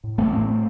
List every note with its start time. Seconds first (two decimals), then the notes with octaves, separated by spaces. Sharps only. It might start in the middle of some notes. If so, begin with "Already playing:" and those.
0.04 A2
0.18 A1 A3 C4
0.33 A2 A3 C4
0.47 A3 C4